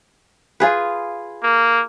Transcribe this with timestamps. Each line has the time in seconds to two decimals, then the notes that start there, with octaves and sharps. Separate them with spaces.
0.60 F4 G#4 B4
1.43 A#3